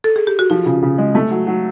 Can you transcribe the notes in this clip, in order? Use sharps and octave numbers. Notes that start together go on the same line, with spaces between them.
A4
G#4
G4
F#4
F3 F4
C#3
C#3
G#3
A3
F#3
F#3